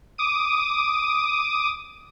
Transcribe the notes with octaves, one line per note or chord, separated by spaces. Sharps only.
D6 D#6 D#7